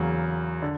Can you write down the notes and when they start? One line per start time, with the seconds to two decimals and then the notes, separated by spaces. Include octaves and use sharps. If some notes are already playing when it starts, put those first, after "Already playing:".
Already playing: E2 C#3 F#3 A#3
0.62 D3